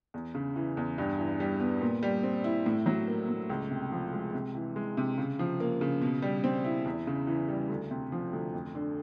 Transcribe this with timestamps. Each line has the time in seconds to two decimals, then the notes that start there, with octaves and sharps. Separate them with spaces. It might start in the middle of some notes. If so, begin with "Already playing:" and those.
0.14 E2
0.35 C#3
0.56 E3
0.77 E2
0.98 G2
1.19 E3
1.40 G3
1.60 B3
1.81 A#2
2.03 G3
2.23 C4
2.44 E4
2.66 A2
2.86 F#3
3.08 A#3
3.29 A2
3.50 C#2
3.71 C3
3.92 F3
4.13 G#3
4.34 C3
4.55 E3
4.76 G#3
4.97 C3
5.18 C#3
5.39 F3
5.60 A#3
5.81 C#3
6.02 B2
6.22 G3
6.44 C4
6.65 E4
6.86 E2
7.07 C#3
7.27 E3
7.48 G3
7.70 D2
7.91 C3
8.12 F3
8.33 D2
8.53 F2
8.75 D3